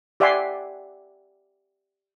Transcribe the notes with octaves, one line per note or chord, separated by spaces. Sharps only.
G4 D5 E5 F#5 G#5 C6